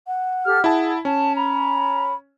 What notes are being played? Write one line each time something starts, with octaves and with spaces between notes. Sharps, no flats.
F#5
G4 A4 F6
E4 G#4 A5
C#4 A5
A#5 B5